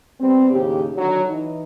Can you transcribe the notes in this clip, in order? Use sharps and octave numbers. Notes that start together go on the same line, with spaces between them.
G3 B3 C4
D#2 A2 C#3 G4
D3 D#3 F#3
E3 D#4